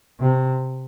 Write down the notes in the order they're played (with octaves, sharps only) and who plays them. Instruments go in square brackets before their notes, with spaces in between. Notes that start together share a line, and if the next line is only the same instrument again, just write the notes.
[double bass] C3